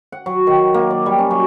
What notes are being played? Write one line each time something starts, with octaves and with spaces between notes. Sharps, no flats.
F#5
F#3
D#3
A#3
D5
G3
C#4
F#3